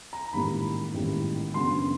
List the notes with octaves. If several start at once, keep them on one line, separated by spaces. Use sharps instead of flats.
A#5
A1 G#2 D#3 G3 A#3 B5
A1 G#2 D#3 G3 A#3
F#2 C#3 F#3 B3 D4 C6